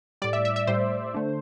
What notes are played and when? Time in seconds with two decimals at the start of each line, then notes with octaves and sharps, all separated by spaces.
0.22 A2 G3 D5
0.33 E5
0.45 E5
0.56 E5
0.67 A2 G3 C5
1.14 D3 A3